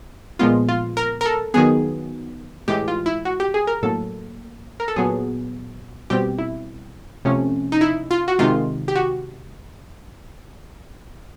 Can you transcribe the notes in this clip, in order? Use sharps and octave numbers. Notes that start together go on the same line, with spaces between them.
A#2 F3 G#3 B3 F4
F4
A#4
A#4
A4
D#3 F#3 B3 G#4
A2 E3 G#3 G4
F4
E4
F#4
G4
G#4
A#4
A2 F#3 A#3 A4
A#4
A4
A#2 F#3 B3 G#4
B2 G3 C4 G4
E4
C3 F3 A3 C#4
D#4
E4
F4
F#4
C3 D#3 G#3 F4
G4
F#4